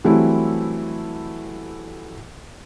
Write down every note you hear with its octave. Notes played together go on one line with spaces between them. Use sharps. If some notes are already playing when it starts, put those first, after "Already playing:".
E3 F#3 G3 A3 C4 E4